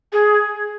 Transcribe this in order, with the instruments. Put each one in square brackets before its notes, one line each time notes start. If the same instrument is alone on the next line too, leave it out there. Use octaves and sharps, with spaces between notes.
[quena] G#4